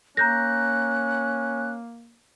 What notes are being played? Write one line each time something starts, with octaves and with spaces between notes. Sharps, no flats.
A#3 C#4 A#5 F#6 G6 A#6